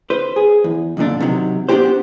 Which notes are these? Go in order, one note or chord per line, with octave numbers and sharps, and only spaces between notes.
B4 C5
G#4
E2
B1 F2 A#2 D3 D4
C3 D#3 F#3
B3 D4 D#4 F#4 G4 C5